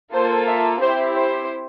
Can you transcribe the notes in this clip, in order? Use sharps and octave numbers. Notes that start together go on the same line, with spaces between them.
A#3 F4 A4 C5
E5
C4 E4 G4 C5
C5